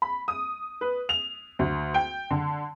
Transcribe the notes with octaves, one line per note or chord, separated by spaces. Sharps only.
B5
D#6
B4
F7
D2
G5
D3